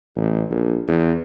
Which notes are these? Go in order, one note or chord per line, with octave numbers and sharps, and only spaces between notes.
A1
A#1
E2